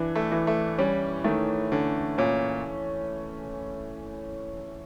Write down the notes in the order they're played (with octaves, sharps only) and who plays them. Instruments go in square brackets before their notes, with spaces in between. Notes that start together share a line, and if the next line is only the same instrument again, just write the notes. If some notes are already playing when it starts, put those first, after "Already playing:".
Already playing: [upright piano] E3 D4
[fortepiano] A3
[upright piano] E3
[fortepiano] A3
[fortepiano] G3 [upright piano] C#4
[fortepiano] D#3 [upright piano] A3
[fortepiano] D3 [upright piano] C#4
[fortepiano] A#2 [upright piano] C#4